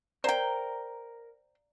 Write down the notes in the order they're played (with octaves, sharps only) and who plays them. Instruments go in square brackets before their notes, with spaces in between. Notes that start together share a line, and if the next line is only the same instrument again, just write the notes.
[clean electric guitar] A#4 [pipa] C5 G5 [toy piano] D5 F5 A#5